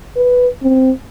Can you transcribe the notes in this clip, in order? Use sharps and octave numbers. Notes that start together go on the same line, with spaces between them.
B4
C4